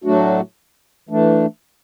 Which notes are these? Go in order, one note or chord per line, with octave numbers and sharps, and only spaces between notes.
A2 F#3 A3 D4 F#4
E3 A3 D4